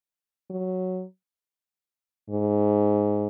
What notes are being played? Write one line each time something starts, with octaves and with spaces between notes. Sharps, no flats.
F#3
G#2